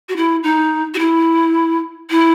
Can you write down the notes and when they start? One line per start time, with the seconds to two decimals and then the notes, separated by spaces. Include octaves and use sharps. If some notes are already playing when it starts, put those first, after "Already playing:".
0.09 F#4
0.16 E4
0.43 D#4
0.94 F#4
0.99 E4
2.10 E4